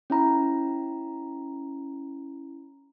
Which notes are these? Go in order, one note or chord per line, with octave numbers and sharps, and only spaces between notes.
C#4 E4 A#5 B5